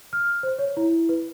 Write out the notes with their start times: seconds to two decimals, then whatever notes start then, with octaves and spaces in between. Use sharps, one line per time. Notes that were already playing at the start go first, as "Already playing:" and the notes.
0.13 F6
0.43 C5
0.59 C#5
0.77 E4
1.09 B4